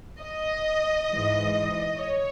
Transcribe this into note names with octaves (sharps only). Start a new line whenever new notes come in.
D#5
G#2 E3
C#5